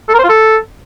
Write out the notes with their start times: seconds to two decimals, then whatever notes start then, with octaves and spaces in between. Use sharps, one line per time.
0.09 A4
0.14 A#4
0.19 C5
0.24 F4
0.29 A4